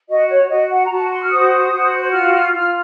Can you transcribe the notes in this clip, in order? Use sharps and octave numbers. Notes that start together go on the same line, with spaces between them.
F#4 D#5
C#5
F#4 D#5
F#5
A#5
F#4 A5
C6
F6
C5 D#6
F#4
F4 F6
F6
F4 F6